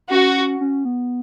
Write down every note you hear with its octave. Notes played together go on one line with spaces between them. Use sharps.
C#4 F#4
C#4
B3